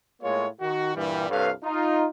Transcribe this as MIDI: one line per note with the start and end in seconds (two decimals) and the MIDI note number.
0.22 0.47 45
0.22 0.47 56
0.22 0.47 58
0.22 0.47 65
0.22 0.47 73
0.61 0.94 51
0.61 0.94 66
0.95 1.30 43
0.95 1.30 46
0.95 1.30 52
0.95 1.30 55
1.30 1.51 36
1.30 1.51 43
1.30 1.51 69
1.30 1.51 71
1.30 1.51 73
1.30 1.51 77
1.63 2.07 63
1.63 2.07 65